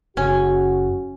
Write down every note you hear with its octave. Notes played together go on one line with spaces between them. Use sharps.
F#1 C#3 C#4 F#4